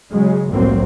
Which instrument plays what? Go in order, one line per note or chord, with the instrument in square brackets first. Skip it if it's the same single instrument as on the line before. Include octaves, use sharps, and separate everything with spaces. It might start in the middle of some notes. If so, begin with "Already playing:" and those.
[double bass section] C#3 F#3 G#3
F1 C2 A2 F#3 A#3 C4